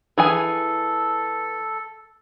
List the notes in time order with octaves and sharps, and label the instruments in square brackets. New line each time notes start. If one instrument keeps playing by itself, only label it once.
[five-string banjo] E3 G#4 G#5 [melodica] A4